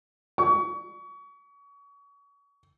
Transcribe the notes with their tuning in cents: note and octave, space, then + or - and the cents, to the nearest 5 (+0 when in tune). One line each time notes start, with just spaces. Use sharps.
C#6 +30